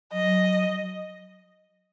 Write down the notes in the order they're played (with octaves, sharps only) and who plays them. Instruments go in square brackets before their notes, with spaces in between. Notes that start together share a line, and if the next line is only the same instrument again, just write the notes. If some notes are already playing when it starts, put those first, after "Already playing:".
[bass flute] F#3 [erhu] D#5